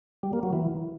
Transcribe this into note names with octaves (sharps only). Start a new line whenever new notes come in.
G3
A#3
F#3
E3